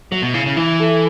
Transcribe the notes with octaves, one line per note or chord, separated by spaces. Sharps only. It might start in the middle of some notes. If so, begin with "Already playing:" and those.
F#3 E5
B2
C#3 E4
C#3
E3 E4
A4